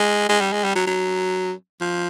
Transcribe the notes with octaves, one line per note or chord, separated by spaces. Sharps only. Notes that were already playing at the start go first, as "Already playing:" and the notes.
Already playing: G#3
G#3
G3
G#3
G3
F#3
F#3
F3